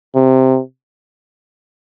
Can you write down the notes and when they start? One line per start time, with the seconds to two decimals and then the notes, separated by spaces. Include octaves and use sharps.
0.15 C3